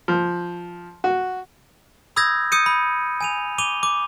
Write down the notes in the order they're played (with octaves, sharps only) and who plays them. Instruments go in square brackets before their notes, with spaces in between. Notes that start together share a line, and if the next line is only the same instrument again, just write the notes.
[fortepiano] F3
F#4
[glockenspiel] B5 D#6 E6 G6 G#6 A#6
D#6 G6 C#7 D#7
B5
G#5 D#7 F7
D6 D#7 F7 G7
D6